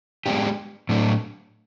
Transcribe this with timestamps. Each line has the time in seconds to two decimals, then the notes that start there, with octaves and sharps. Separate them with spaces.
0.26 G#3 B3 D4 G4
0.89 A2 F#3 A3 D4